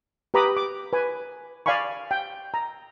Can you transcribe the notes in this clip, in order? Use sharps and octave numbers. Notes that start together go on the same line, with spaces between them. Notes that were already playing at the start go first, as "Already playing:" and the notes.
G4 B4 A#5 B5 D6 D#6
D6
B4 G#5
D5 F5 G#5 B5 C#6
G5
A#5